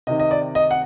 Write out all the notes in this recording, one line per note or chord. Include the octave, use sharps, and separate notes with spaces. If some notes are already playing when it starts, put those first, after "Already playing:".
C3 D#3 D#5
D#5
D5
D#5
F#5